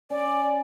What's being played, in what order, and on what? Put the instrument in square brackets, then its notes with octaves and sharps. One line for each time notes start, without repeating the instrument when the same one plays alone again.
[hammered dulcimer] C#4 [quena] D5